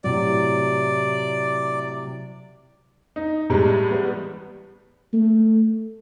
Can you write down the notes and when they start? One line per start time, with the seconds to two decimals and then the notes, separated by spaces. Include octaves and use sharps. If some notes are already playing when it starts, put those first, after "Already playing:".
0.04 A2 C3 F#3 D5
3.16 D#4
3.50 A2 G3 G#3
3.90 E2 G3 B3
5.13 A3